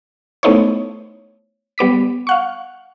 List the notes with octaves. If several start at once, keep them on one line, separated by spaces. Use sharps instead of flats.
A3 B3 D#4 E4 C5 C#5
G3 B3 D6 B6
F5 F#5 C#6